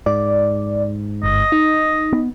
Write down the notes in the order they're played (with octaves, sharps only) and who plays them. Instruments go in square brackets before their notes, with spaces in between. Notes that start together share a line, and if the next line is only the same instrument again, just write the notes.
[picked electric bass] G#2 [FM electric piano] D5
[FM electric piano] G1 [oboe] D#5
[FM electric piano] D#4
[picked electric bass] B3